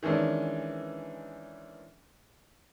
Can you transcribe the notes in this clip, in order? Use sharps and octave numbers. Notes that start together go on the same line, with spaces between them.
D#3 E3 G#3 C#4 D4